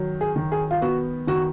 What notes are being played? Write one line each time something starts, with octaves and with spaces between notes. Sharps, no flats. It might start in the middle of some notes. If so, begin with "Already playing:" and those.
Already playing: D#3 F#3
G#4
D#3
G#4
F4
B3 F#4
D#3 F#4